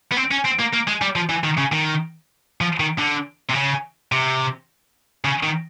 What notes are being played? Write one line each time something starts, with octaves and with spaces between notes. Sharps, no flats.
B3
C4
C#4
C4
A#3
A#3
G#3
G3
F3
E3
D#3
C#3
D#3
F3
D#3
D3
C3
C#3
C3
C#3
D#3